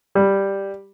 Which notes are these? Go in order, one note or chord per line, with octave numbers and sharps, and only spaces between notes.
G3